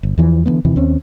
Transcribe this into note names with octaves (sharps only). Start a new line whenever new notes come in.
G1
E2 E3 F3
D3 E3 A3 B3
E2 C3 D#3 E3
D#2 C4 C#4